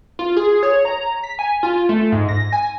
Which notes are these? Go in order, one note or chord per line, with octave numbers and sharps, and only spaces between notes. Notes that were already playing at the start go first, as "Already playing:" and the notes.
F4
G#4
C#5
A#5
B6
G#5
F4
A3
G#2
A#6
G#5